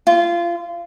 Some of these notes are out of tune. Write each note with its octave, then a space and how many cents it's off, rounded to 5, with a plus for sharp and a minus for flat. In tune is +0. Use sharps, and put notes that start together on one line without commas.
F4 -25